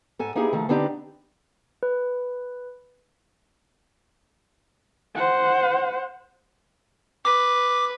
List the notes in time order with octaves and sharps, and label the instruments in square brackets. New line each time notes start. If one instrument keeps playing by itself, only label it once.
[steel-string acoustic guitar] G#2 A4 G#5
A#3 B3 D#4 E4 G4 G#4
D#3 F3 A3
D3 B3 C4 D4 D#4 G4
[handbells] B4
[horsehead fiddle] C5 F#5
[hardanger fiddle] B4 [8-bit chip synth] D6